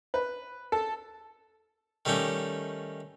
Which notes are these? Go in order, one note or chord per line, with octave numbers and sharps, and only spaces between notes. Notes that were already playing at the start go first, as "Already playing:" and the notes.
B4
A4
D#3 G3 A3 C#4 D#4 G4